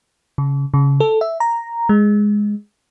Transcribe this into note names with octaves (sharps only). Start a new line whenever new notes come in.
C#3
C#3
A4
E5
A#5
G#3